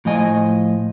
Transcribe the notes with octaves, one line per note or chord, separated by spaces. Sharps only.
A2 F3 D#5 G#5